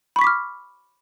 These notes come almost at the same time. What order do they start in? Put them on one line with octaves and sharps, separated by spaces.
B5 C#6 B6 D6 F6